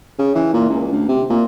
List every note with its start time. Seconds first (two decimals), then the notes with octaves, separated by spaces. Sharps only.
0.19 C#3
0.35 E3
0.53 A#2
0.69 C#2
0.92 D2
1.08 C3
1.30 A#2